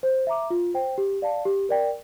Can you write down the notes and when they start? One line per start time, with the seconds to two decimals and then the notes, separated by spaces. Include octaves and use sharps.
0.03 C5
0.27 E5 A#5 D6
0.50 F4
0.74 C5 G5
0.98 G4
1.22 D5 F5 A5
1.45 G4
1.69 A#4 D5 G5